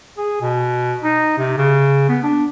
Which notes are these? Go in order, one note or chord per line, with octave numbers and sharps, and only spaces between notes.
G#4
B2
D#4
C3
C#3
B3
D4